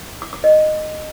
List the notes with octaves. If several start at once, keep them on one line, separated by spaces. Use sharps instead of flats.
D6
D6
D#5